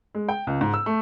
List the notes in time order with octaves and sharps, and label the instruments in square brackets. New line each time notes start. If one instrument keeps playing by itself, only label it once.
[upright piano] G#3
G5
C#2
G#2
E6
A3